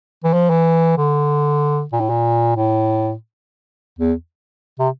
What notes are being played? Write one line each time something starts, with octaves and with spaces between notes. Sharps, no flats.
E3
F3
E3
D3
A#2
A2
A#2
A2
E2
C3